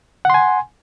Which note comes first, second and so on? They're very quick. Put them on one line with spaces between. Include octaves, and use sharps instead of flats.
F#5 C6 G#5